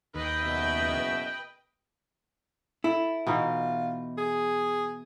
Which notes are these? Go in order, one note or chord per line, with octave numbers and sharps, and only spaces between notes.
D#2 B4 D#5 G5
F#1 B2 E5
E4 A4
B2 E3 D#4 F4
G#4